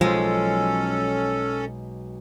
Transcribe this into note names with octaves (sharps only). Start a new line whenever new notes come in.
B1 F3 G#3 C#4 A4